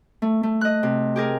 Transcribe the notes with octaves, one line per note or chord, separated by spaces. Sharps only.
A3
A3
D#5 F#6
C3
G4 G#4 A#4